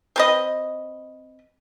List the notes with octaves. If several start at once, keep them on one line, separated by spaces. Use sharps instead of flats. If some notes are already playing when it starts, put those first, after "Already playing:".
C4 B4 D#5